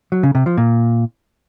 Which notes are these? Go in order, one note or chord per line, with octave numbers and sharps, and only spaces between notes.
F#3
C#3
C3
F3
A#2